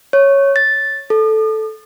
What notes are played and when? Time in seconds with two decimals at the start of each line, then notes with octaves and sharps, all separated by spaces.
0.13 C#5
0.56 A6
1.10 A4